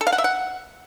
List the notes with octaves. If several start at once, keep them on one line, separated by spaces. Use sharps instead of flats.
A4
F5
F#5
E5
F#5